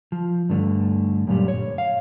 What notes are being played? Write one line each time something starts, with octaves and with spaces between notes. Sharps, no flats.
F3
G2 D3 A3
F#2 A#2 G3
C#5
F5